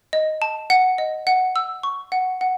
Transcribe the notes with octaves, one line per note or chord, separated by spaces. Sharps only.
D#5
A5
F#5
D#5
F#5
E6
C#6
F#5
F#5